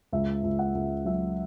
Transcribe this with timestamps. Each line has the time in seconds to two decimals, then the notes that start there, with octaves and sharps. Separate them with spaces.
0.12 C#2 E5
0.43 C#2
0.59 F#5
0.75 C#2
1.05 F#3 E5